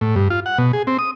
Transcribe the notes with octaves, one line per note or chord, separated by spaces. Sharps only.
A2
G2
F4
F#5
B2
G#4
C4
D#6